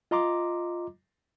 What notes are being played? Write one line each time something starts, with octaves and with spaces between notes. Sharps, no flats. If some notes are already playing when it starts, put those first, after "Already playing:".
F4 D#5 A#5 C6 D6